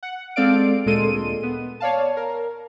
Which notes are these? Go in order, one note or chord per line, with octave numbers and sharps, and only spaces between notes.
F#5
G#3 C4 A4 D5 F5 D7
D2 A#2 G#3 A4 C6 D#7
B3
C#5 D5 F5 A5
A#4